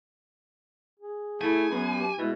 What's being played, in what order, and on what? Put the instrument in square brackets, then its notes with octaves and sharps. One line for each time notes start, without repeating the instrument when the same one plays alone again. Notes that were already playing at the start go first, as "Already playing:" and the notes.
[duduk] G#4
[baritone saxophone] A3 [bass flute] E4 [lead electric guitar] G#5
[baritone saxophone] F#2 [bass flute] B3
[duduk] G4
[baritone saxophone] B2 [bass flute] G#3 [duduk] E4